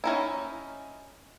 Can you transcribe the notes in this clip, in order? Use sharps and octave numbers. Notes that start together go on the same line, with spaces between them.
C#4 D#4 E4